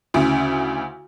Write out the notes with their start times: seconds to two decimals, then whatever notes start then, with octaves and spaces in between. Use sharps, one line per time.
0.14 D2 C#3 E4